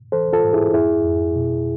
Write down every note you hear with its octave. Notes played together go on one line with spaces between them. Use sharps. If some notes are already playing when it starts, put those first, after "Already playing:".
E3 A4 C5
F4 A4
G#2
E4 G#4
F2 E4 G#4
F2
B2